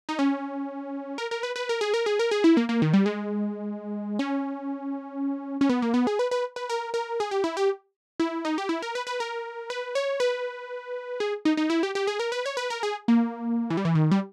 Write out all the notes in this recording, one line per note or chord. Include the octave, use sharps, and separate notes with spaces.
D#4
C#4
A#4
A#4
B4
B4
A#4
G#4
A#4
G#4
A#4
G#4
E4
A#3
A#3
D#3
G3
G#3
C#4
C#4
B3
A#3
B3
G#4
B4
B4
B4
A#4
A#4
G#4
G4
E4
G4
E4
D#4
G4
E4
A#4
B4
B4
A#4
B4
C#5
B4
G#4
D#4
D#4
E4
G4
G4
G#4
A#4
B4
C#5
B4
A#4
G#4
A#3
E3
G3
E3
D#3
G3